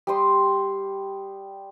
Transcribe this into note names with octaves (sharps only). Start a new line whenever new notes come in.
G3 G5 C6 D#6